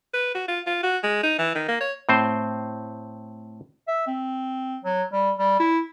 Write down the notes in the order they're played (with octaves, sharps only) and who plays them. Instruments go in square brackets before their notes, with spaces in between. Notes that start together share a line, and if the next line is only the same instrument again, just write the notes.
[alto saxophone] B4
F#4
F4
F4
F#4
G#3
D#4
E3
D#3
A#3
C#5
[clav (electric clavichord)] A2 C4 C5
[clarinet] E5
C4
F#3
G3
G3
E4